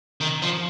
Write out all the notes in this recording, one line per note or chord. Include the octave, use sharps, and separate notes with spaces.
D#3
F3